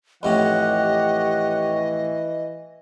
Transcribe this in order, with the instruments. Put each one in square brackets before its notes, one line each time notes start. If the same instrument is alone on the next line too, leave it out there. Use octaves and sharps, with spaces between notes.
[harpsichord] F2 A2 C#4 [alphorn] E3 [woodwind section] G4 C#5 F#5 [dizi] D#5